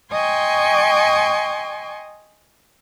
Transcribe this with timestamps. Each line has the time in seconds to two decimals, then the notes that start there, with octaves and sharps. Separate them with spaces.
0.10 D#5 G5 G#5 C6 C#6